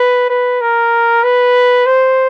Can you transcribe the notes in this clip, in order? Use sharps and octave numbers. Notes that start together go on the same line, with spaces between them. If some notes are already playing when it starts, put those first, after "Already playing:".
Already playing: B4
B4
A#4
B4
C5